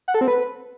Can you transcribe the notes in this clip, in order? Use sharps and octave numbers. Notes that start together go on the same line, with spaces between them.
F#5
A4
C4
B4